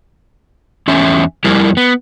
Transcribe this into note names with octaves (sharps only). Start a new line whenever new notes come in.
E2 C#4 E5
F2 G3 E4 A#4
B3